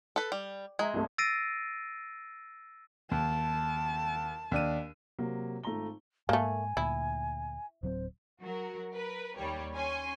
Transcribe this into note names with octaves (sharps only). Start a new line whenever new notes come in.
A4 B4
G3
G#3 E5 A#5 G#6
C2 G2 A3
E6 A6 A#6 C7 D7 D#7
D#2 A5
D#2 D4 D#7
C3 F#3 A#3
G#1 A3 F4 A#5 G7
G#2 A3 A#3 G#5
D2 A#2 E4
D1 F#3 C4 C5
F#3 F#4 A#4
A#4 B4
D#2 G3 C#5
C#4 G#5 C6 C#6